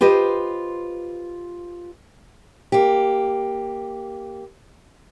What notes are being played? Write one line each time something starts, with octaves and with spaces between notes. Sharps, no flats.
F4 G4 B4 C5 D#5
A#3 G4